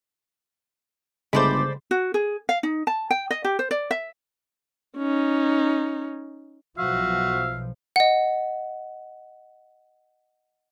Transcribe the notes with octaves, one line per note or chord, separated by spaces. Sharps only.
G1 C#3 G#3 A3 C5 D5 B5
F#4
G#4
F5
D#4
A5
G5
D#5
G4
C5
D5
E5
C#4 D#4
B1 B2 F3 F#4 E5 F5
D#5 F#5